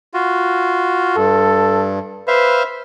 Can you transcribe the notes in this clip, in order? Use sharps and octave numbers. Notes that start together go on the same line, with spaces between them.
F4 F#4
G2 A4
B4 C5 E5 F5